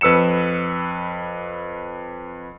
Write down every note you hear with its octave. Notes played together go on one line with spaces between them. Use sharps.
F2 B4 E6 C#7 E7